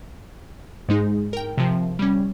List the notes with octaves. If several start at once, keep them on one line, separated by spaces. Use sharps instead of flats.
G#2 G#3 D#4 G#4
A#4 G5
C3 F3
G3 C#4